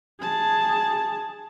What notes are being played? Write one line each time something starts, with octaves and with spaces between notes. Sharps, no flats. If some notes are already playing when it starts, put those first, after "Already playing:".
G#4 A5